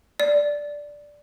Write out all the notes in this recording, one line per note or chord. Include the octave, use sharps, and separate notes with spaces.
D5